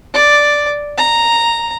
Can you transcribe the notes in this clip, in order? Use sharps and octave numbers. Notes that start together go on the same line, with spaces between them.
D5
A#5